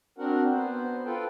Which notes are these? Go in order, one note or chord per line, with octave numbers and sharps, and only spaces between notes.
C4 D4 F#4 A#4 F#5
B3 C5
F4 A4 B4 G5